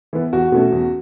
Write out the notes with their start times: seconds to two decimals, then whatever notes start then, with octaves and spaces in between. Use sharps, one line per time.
0.13 E3 B3
0.33 E2 F#4
0.52 B2 A3 C#4
0.72 E2